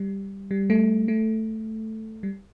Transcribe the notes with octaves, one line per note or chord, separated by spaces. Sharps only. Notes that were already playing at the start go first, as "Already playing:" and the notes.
Already playing: G3
G3
A3
A3
G3